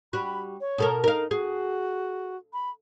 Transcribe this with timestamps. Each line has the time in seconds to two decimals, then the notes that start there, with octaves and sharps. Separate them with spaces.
0.13 G3 F#4 B5
0.61 C#5
0.78 B2 A4 A#4
1.04 D#4 A#4 F5
1.31 F#4 G#4
2.53 B5